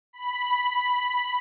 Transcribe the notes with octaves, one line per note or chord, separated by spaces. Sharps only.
B5